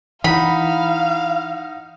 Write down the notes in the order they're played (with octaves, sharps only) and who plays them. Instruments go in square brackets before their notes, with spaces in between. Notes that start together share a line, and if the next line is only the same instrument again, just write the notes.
[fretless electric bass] E3 [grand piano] D#4 F#5 [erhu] F5 [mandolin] B5